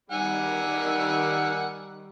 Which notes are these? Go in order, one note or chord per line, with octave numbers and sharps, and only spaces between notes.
D#3 G3 D#4 F#5 G#5 E6